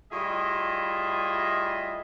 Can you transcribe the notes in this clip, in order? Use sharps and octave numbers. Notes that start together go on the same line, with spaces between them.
A2 G3 F4 G#4 D#5 E5